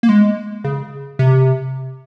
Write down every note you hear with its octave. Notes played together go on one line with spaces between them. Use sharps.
A#3
G#3
C#3
C3